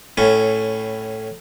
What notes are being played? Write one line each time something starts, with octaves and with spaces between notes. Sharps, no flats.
A2 C#4